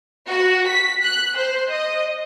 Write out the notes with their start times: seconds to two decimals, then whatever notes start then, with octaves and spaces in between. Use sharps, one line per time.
0.27 F#4
0.67 B6
1.04 F#6
1.37 C5
1.71 D#5